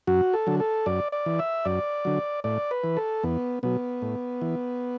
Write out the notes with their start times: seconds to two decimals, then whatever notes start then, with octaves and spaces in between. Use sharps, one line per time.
0.07 F#2 F#4
0.34 A4
0.47 D3 F#3
0.60 A4
0.86 F#2 D5
1.12 D5
1.26 E3
1.39 E5
1.65 F#2 D5
2.05 D3 F#3
2.44 A2 D5
2.71 B4
2.84 E3
2.97 A4
3.23 E2 B3
3.63 B2 F#3 B3
4.02 A2
4.42 E3